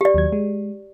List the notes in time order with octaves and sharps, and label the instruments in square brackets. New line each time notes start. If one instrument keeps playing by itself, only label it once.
[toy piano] G4 D5
[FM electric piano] D#2 F#3 G#6
G#3